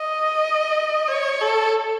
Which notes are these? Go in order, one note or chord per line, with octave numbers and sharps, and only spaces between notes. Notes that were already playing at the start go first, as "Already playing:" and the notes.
Already playing: D#5
C#5
A4